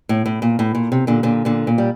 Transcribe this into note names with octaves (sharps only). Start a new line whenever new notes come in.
A2
A2
A#2
A2
A#2
C3
A#2 D3
A#2 D3
A#2 D3
A#2
G3